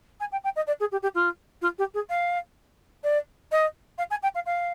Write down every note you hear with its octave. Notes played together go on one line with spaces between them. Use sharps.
G#5
G5
G5
D#5
D5
G#4
G4
G4
F4
F4
G4
G#4
F5
D5
D#5
F5
G#5
G5
F5
F5